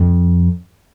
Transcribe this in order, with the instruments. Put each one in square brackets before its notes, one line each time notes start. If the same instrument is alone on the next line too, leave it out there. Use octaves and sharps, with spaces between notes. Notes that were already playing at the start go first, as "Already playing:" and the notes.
Already playing: [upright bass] F2